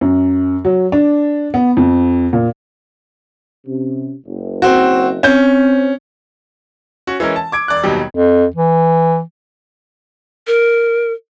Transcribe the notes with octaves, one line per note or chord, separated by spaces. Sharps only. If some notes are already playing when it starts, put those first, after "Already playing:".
F#2
F#3
D4
B3
F2
A#2
C3 C#4
F#1
C4 F#4
C4 C#4 G6
C#4 F#4
E3 G#3 C#4 A#4
A5
D6 G#6 D7
E1 D5 D6 F#6
G#1 D#2 B2 F#3 G3
F2
E3
A#4